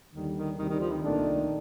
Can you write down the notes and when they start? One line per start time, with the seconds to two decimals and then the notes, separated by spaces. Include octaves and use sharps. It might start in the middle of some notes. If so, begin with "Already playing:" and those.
0.14 D#2 D3 D#3 G3
0.36 D#3
0.58 D2 C3 D#3 G3
0.69 D#3
0.80 F3
0.91 D#3
1.02 C2 A#2 D#3 A3 D4